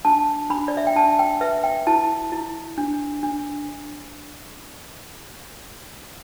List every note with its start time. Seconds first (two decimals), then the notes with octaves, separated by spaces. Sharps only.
0.05 D4 A5
0.50 D4 B5
0.68 D5
0.77 E5
0.87 G5
0.95 D4 A5
1.19 G5
1.41 B4 E5
1.64 G5
1.87 E4 A5
2.32 E4
2.78 D4
3.23 D4